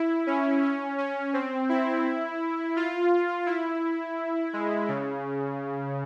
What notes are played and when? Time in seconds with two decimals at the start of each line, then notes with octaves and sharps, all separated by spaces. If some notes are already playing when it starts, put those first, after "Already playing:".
Already playing: E4
0.27 C#4
0.63 C#4
0.98 C#4
1.34 C4
1.69 E4
2.76 F4
3.46 E4
4.53 G#3
4.88 C#3